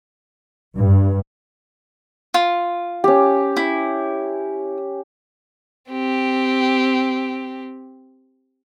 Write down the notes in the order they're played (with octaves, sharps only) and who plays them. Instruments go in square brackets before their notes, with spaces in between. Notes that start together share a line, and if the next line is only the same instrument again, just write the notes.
[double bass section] G2
[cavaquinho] F4
[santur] C#4 G4
[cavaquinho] E4
[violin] C4 G4